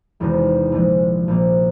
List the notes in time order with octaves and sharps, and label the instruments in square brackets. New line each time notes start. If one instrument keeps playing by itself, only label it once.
[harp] E1 E2 C3 D#3 G#3
A#1 A#2 F3 G#3
A#1 A#2 F3 A#3